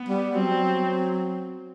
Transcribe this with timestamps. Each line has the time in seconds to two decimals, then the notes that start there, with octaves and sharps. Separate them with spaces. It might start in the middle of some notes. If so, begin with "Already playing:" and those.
Already playing: B3
0.08 G3
0.35 F#3 C4